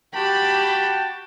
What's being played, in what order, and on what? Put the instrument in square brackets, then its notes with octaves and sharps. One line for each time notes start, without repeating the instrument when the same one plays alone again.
[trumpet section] F#4 G5 A5 [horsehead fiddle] G4 B5